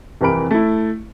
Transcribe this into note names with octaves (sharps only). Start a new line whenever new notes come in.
C2 F2 E3 A#4 B5 D7
A3 E4